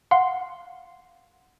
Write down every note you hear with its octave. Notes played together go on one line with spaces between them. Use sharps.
F5 F#5 C6